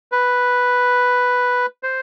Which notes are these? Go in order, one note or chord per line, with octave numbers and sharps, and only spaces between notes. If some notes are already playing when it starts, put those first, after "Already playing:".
B4
C5